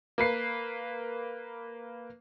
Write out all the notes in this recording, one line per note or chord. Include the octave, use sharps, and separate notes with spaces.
A#3 B4 C7